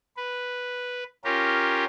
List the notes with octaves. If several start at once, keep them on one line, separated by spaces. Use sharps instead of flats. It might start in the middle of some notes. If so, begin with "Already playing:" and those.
B4
C#4 F4 G4 A#4